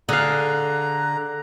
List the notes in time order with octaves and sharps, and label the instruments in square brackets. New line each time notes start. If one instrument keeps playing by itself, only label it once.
[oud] D3 [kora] G#4 F5 [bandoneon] A#5 [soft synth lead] F#6